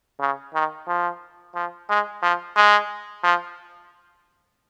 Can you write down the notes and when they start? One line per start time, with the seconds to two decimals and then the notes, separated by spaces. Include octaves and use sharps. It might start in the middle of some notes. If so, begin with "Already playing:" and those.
0.20 C#3
0.54 D#3
0.88 F3
1.55 F3
1.90 G#3
2.23 F3
2.56 G#3
3.24 F3